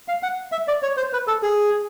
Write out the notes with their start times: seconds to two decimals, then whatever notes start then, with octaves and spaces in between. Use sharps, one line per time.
0.08 F5
0.23 F#5
0.52 E5
0.68 D5
0.82 C#5
0.97 C5
1.13 B4
1.27 A4
1.43 G#4